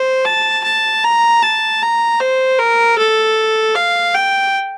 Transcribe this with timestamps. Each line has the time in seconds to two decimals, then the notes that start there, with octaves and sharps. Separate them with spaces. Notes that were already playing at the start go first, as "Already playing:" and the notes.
Already playing: C5
0.25 A5
0.64 A5
1.04 A#5
1.42 A5
1.82 A#5
2.20 C5
2.59 A#4
2.98 A4
3.75 F5
4.15 G5